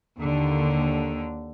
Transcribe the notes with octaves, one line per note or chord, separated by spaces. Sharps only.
D#2 D3